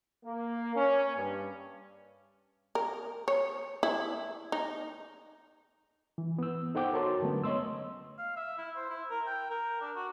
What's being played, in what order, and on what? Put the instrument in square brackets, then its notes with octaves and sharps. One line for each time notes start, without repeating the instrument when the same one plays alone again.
[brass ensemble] A#3
C#4
G2
[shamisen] A#4
C#5
E4
D#4
[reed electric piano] E3
B3 E6
D#4 A4 C5 F#5 G5 D6
F#4 A#4 C#5 A5 C6
D3 F#3 G#3 A3 B3 C#4
C#5 D#5 C6 E6
[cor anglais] F5
E5
E4
C5
E4
A#4
G5
A#4
D4
F#4